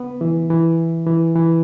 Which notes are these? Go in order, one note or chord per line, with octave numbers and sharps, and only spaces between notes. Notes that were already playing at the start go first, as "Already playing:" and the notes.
Already playing: B3
E3
E3
E3
E3